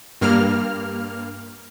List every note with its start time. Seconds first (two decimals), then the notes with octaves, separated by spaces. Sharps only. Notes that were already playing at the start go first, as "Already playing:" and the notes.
0.21 G2 A#3 F6